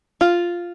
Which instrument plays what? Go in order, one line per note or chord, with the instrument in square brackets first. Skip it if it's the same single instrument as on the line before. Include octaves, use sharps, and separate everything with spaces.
[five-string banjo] F4